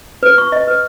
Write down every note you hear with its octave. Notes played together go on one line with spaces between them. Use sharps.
B4
C#6
D#5
B4